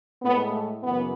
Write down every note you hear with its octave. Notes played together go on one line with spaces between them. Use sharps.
A2 G#3 B3
A3
F#2 C#3 E3 B3